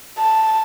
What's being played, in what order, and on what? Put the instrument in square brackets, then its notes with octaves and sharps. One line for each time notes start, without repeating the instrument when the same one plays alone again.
[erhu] A5